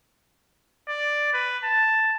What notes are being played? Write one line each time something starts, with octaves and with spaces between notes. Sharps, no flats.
D5
B4
A5